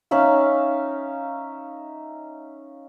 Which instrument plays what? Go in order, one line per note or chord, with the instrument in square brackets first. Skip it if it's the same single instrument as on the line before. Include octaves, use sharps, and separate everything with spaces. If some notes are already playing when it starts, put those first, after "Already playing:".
[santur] C#4 D#4 E5 F5